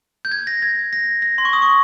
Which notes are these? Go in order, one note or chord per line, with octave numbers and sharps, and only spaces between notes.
G6
G#6
A#6
G#6
A#6
A#6
C6
C#6
D#6
C#6